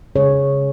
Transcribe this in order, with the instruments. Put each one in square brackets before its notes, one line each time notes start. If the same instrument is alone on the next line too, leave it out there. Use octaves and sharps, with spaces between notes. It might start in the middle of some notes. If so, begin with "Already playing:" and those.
[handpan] C#3 G#3 G#4 C#5